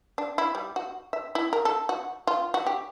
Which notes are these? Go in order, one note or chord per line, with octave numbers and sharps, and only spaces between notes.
D4
E4
G3
F#4
E5
E4
A#4
A4
F#4
F4
F#4
G4